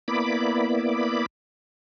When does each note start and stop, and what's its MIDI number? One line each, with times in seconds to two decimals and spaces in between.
0.08 1.26 58
0.08 1.26 59
0.08 1.26 64
0.08 1.26 74
0.08 1.26 83
0.08 1.26 86